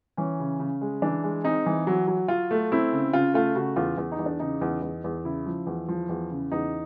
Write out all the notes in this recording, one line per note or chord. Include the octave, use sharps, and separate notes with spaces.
E3 C#4
C#3
C#3
G#3
E3 D4
G#3
C4 D#4
E3
F#3
F#3
F#3 F4
A3
C4 E4
C#3
C#3 F4
A3 F4
C#3 F#4
E2 F4
E2
D#4
E2
D4
C#3 D#4
E2
E2
E2
C#3 E4
F3
E2
F3
E2
C#3
E2 D#4